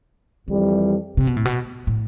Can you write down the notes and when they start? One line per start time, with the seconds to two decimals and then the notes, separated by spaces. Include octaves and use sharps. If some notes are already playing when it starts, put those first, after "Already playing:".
0.47 F2 D3 E3 G3
1.17 C3
1.27 B2
1.37 A2
1.45 B2
1.87 A2